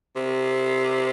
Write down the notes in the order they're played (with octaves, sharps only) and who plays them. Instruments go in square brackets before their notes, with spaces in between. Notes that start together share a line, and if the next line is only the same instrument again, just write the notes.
[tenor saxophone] C3